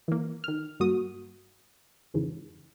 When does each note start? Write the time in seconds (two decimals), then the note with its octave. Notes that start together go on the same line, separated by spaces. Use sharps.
0.08 E3 A#3
0.44 D#3 F6
0.80 G2 A#3 F#4 D#6
2.14 F2 G#2 C#3 E3